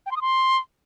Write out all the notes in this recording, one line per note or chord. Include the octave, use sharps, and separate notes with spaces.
G5
C6
D#6
C6